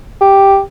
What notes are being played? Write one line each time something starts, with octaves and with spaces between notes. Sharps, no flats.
G4